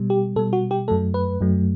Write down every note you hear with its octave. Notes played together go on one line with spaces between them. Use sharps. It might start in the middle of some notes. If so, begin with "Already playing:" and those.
Already playing: B2 G3
G4
B2 G3 A4
F#4
G4
F#2 F#3 A3 A4
B4
F#2 F#3 A3